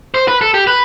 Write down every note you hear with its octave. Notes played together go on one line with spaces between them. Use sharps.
C5
B4
A4
G4
B4